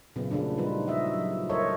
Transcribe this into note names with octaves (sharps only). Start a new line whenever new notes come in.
A#2 C#3 F#3 A#3 B3
C#3 F3 A3 D4
F3 G3 D#4 F4 B4
F#4 D#5 E5
F#3
A4 A#4 C5 C#5 D#5 E5